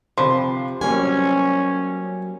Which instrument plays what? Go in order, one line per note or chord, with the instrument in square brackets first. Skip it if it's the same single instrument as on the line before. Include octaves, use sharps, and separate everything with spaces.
[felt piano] C3 B5 C6 [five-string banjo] F3
[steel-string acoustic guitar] F#3 A#3 G#5 [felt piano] G3 [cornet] C#4